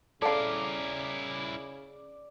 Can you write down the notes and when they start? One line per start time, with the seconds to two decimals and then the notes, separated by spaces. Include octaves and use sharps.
0.22 C#3 E4 A4 A#4 D5 F5 D6